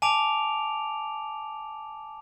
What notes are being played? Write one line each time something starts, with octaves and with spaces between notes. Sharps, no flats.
G#5 A5 D6 D7 F7